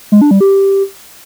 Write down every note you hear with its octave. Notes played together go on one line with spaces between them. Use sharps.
G#3
D4
G3
G4